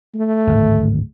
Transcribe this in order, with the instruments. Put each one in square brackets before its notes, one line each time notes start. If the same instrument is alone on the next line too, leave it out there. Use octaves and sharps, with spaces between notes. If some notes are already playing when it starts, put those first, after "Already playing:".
[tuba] A3
[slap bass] D1 G#1